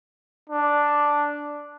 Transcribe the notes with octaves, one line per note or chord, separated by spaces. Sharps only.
D4